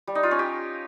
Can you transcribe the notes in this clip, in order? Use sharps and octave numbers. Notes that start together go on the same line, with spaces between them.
G3
D#4
F4
C#4
G4